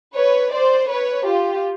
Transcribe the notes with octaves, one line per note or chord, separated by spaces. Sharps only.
B4 C#5
C5 D5
B4 C#5
F4 G4